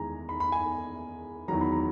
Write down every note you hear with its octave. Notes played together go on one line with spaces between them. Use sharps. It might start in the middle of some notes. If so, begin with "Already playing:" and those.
Already playing: E2 D#3 G#3 G#5 A#5
B5
B5
G#5
E2 D#3 F#3 A#5
B5
A#5